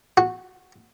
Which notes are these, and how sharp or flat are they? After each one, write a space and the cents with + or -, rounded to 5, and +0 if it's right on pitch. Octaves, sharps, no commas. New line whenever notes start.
F#4 -10